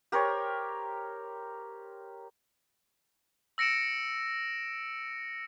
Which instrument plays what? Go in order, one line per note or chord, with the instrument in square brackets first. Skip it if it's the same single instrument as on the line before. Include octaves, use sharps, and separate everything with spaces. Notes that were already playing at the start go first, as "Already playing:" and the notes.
[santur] G4 A#4 C5 C#5
[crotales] E6 A#6 C#7 D7 E7